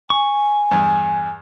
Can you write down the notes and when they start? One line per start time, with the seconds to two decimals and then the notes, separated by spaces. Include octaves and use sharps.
0.10 G#5 C#6
0.71 E2 G2